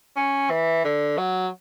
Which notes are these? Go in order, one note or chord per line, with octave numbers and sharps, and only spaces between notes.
C#4
E3
D3
F#3